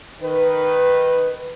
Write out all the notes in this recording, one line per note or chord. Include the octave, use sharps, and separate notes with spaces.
D#3 B4